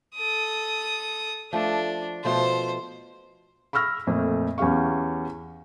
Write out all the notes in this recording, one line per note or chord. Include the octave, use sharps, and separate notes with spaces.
A4 D#6
F3 A3 D4
B2 F3 A3 C5
B5 C#6 E6 F6 A#6
F2 A#2 A3
E2 C#4 G4 F5 C#6